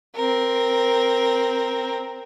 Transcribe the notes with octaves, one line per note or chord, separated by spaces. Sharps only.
C4 A#4